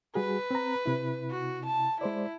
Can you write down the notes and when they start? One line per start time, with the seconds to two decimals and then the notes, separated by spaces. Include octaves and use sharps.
0.15 G3 F#4 G#4 B4
0.51 C4 A#5
0.86 C3 E4
1.31 F#4
1.66 A5
2.01 G#3 E4 C5 D5